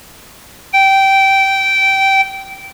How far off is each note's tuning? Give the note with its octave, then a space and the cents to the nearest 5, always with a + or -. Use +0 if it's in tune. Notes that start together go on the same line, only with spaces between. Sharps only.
G5 -15